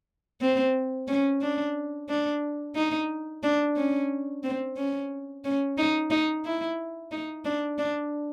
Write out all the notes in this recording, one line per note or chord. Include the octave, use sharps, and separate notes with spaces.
C4
C#4
D4
D4
D#4
D4
C#4
C4
C#4
C#4
D#4
D#4
E4
D#4
D4
D4